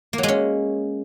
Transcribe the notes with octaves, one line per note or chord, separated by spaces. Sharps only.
A#3
F#3
G#3
C#4